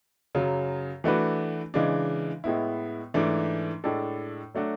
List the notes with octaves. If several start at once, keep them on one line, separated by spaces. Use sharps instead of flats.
F#2 C#3 F#3
E3 A3 D4 F#4 B4
C#3 E3 G#3 D4
A2 G#3 B3 E4
G#2 E3 A3 D4
A2 G#3 D4 A4
F#3 A3 D4 F#4